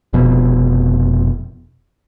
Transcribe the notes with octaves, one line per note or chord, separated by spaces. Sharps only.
F1 F2 B2